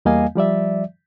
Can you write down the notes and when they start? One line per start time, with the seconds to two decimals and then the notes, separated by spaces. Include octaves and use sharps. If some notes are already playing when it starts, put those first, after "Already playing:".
0.05 E2 G3 A#3 D#5 F5 G#5
0.35 F3 G3 D5 E5